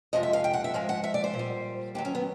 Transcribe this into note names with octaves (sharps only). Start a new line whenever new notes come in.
F2 C3 F3 G#3 D#5
E5
F5
G5
F#5
E5
G#2 F3 G#3 F5
F#5
E5
D5
C5
A#2
G3
D#2 D#3 F#3 G4
C#4
B3